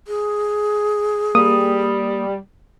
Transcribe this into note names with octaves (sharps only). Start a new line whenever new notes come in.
G#4
G3 A#3 D#6